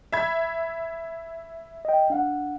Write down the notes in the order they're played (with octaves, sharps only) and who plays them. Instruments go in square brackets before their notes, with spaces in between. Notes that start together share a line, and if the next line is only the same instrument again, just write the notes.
[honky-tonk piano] E5 B5 G#6
[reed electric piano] D#5 G5
D4 F5 F#5